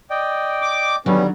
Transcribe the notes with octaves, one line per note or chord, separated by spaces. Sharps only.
D5 D#5 G5
D6
D3 D#3 F#3 G3 B3 C#4